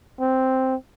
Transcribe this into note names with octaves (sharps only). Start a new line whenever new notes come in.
C4